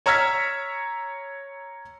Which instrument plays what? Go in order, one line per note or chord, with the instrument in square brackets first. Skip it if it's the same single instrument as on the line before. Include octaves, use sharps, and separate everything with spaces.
[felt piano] C#5 A#5 E6 F6 G#6 B6